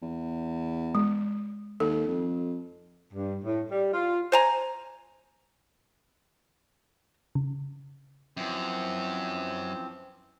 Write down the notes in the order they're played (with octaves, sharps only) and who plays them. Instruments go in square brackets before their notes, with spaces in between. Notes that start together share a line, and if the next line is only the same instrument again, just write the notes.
[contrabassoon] E2
[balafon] G#3
[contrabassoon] D#2 [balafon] A4
[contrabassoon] F2
[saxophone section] G2
A2
G3
F4
[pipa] C5 G#5 A#5
[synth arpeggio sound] C#3
[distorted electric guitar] F#2 [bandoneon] E3 F3 C4